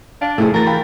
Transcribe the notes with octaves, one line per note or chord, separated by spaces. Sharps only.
D4 F5 D7
F2 C3 A3 E4 G#4
E3 F#4 A#4 A6
F5 G5 B5